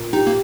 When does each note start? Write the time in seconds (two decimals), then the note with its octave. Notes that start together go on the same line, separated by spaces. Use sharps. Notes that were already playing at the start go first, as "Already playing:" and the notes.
Already playing: A#2
0.13 D#4 G4
0.27 A#3